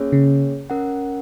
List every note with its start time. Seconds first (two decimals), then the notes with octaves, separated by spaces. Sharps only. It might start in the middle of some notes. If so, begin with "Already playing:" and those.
Already playing: A#3 C#4 G#4 C#5
0.12 C#3
0.70 C#4 A#4 F#5